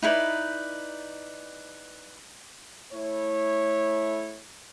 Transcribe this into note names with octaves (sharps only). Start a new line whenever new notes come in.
D#4 E4 B4 D5
A3 E4 C#5